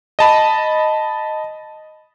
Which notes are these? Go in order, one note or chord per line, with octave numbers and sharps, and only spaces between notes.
D#5 A5 B5